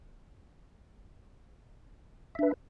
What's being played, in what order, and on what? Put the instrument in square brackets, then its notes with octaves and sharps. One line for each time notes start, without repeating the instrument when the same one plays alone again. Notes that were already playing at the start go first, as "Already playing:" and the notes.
[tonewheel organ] E5
D4
B4